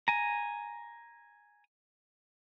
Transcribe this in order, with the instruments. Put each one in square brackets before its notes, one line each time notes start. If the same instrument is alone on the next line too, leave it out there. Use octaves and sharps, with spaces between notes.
[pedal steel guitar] G#5 A#5